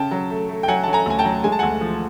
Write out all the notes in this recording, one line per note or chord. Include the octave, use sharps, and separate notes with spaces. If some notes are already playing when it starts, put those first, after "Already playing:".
Already playing: C#3 G5 A5
F#3
A3
A3
G5
F#3 F#5 G#5
F#3 A5
G#5 A#5
D2 G#5
G5 A5
F#3
G#3 G#5
A5
D2 F#5 G#5
F3